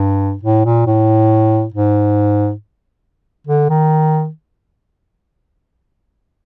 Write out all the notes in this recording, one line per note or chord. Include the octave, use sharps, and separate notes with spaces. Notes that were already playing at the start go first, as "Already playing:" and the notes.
Already playing: G2
A2
A#2
A2
G#2
D3
D#3